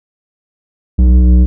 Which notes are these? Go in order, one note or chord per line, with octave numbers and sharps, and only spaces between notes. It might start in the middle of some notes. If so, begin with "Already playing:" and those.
B1